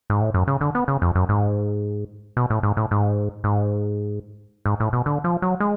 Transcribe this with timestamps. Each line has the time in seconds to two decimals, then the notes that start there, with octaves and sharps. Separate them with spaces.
0.10 G#2
0.21 A2
0.34 F#2
0.48 C#3
0.61 D3
0.75 B3
0.88 C#3
1.02 F2
1.15 F#2
1.29 G#2
2.37 B2
2.50 A2
2.63 G#2
2.77 A2
2.91 G#2
3.44 G#2
4.66 G#2
4.80 A2
4.93 B2
5.06 D3
5.24 F3
5.42 F#3
5.60 G#3